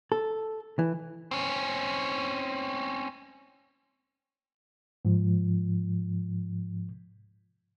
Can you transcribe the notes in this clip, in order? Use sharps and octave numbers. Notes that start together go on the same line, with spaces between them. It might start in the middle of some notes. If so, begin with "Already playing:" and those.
A4
E3
C4 C#4
G#2 F3